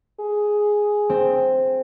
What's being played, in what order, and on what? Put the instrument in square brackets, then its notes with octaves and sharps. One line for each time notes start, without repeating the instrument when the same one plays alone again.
[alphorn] G#4
[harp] C4